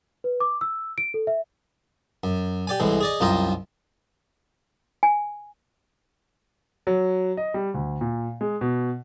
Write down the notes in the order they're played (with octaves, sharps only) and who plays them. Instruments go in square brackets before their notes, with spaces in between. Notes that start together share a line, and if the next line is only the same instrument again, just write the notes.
[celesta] B4
D6
E6
D7
A4
E5
[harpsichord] F#2
G4 D5 G#5
C2 A2 E3 G#3
G#4 D5 D#5
C2 F#2 F4 D#5 G5 A#5
[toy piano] G#5
[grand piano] F#3
D#5
G3
D2
A#2
G#3
B2